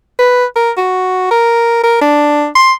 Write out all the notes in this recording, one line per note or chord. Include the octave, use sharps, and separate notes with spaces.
B4
A#4
F#4
A#4
A#4
D4
C6